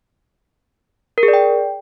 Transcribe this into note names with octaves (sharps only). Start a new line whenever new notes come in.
A#4
G#4
D5
G5